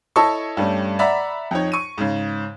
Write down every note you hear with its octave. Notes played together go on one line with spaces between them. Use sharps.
E4 A4 C#5 D#5 A5 C#6
G2 G3 A3 C#4
D5 E5 F#5 A#5 B5
F2 D#4 C#5
C#6 D#7
G#2 C#3